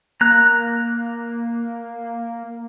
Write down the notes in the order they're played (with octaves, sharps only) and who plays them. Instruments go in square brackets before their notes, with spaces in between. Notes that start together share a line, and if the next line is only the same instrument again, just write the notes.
[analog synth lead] A#3 [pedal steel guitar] A#5 F#6